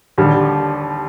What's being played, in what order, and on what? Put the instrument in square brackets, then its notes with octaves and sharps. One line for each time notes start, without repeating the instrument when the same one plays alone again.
[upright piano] D#2 D3 G3